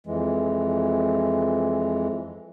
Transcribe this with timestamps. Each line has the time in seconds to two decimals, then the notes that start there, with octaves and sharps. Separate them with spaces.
0.07 F2 E3 G#3